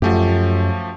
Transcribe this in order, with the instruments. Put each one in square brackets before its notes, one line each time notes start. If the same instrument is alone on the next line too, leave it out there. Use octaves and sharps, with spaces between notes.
[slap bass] F#2 [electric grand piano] F3 A3 G4